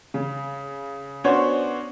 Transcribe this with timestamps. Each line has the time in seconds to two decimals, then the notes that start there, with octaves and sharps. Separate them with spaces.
0.14 C#3
1.24 B3 C#4 D4 F#4 C5 C#5